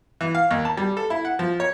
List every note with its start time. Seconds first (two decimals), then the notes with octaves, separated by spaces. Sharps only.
0.21 E3
0.35 F5
0.51 D#2
0.65 A5
0.77 G3
0.97 A4
1.10 E4
1.25 F#5
1.39 F3
1.60 C#5